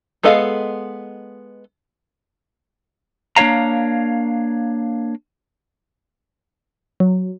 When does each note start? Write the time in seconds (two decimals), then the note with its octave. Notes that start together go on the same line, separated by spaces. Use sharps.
0.23 G#3 B3 A4 D#5 F5
3.36 A#3 D4 F4 C#5 F5 A#5
7.00 F#3